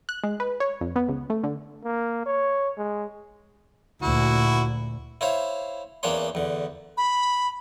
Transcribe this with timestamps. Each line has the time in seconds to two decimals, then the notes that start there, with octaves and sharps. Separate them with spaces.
0.09 F#6
0.23 G#3
0.40 B4
0.60 C#5
0.81 F2
0.96 B3
1.08 C#2
1.30 A3
1.43 D3
1.84 A#3
2.26 C#5
2.77 G#3
4.02 D2 A#2 E4 F#4
5.21 E4 C5 C#5 F5
6.03 E2 A#3 C#4 D4 C#5 C6
6.35 E2 D3
6.97 B5